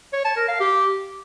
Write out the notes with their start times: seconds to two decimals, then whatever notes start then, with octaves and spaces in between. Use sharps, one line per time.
0.13 C#5
0.25 A5
0.36 A#4
0.48 F5
0.60 G4